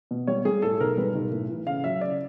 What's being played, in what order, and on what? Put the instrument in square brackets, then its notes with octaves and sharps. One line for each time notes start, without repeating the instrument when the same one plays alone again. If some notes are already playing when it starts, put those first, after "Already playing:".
[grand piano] B2
G3 C#5
G3 G#4
A2 A4
B1 A#4
G3 B4
B1
A2
E3
C#3 F5
F#3 E5
C#3 D5